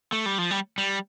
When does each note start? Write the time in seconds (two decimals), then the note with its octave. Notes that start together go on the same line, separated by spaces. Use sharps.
0.12 A3
0.26 G3
0.38 F3
0.51 G3
0.78 G3